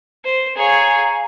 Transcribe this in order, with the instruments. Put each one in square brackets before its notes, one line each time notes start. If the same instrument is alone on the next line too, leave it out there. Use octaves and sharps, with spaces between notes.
[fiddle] C5
[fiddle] G#4 C#5 [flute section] F5 G#5 A#5